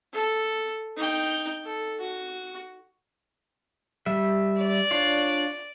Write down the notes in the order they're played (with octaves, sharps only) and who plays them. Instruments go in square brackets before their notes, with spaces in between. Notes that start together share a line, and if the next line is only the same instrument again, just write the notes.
[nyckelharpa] A4
D#4 G5
A4
F#4
[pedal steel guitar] G3 E5
[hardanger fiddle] D5
[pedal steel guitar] D4 F4 C#5